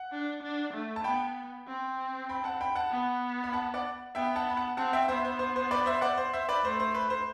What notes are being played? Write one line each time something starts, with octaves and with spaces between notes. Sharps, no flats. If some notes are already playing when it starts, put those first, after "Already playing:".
Already playing: F#5
D4
D4
A3
A5
B3 G5 B5
C4
G5 B5
F#5 A5
G5 B5
F#5 A5
B3
B5
F#5 A5
D5 F#5
B3 E5 G5
F#5 A5
B5
F#5 A5
C4 F#5 A5
E5 G5
B3 C5 E5
C5
C5
C5
B4 D5
C5 E5
D5 F#5
C5
C5 E5
B4 D5
A3 C5
C5
B4
C5